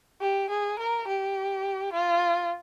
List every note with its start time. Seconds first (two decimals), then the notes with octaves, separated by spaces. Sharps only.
0.21 G4
0.50 G#4
0.79 A#4
1.07 G4
1.93 F4